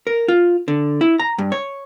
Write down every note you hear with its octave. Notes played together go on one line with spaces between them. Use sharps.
A#4
F4
D3
E4
A#5
G2
C#5